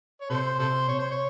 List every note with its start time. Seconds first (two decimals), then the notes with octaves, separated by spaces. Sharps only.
0.21 C#5
0.30 C3 A4 C5
0.59 C3 A4 C5
0.88 C3 C#5
0.99 C5
1.11 C#5